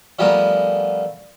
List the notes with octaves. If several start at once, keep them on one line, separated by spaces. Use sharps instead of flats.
F3 G3 A3 B3 G#4 A#4